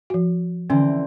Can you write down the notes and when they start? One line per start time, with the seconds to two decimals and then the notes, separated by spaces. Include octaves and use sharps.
0.10 F3 F#4
0.70 D3 E3 C4 C#4